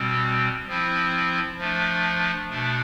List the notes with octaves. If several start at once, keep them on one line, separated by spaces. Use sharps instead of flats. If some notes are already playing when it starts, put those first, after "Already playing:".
Already playing: B2 G3 C4
F3 C4 E4
F3 A3 D4
B2 A3 D4